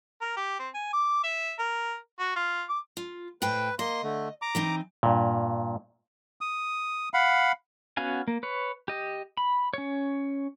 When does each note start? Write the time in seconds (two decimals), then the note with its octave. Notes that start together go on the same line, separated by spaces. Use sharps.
0.21 A#4
0.37 G4
0.60 C4
0.74 G#5
0.93 D6
1.24 E5
1.59 A#4
2.19 F#4
2.36 F4
2.69 D6
2.97 F4
3.42 A2 B4 C5 G5
3.79 A#3 D#5 C6
4.03 D3 A3
4.42 A#5 D6
4.55 E3 C4 D#4
5.03 G2 A#2
6.41 D#6
7.14 F5 F#5 B5
7.97 B3 C#4 F#4 F5 G#5
8.28 A#3
8.43 B4 C#5
8.88 G4 D#5
9.37 B5
9.74 C#4 C#5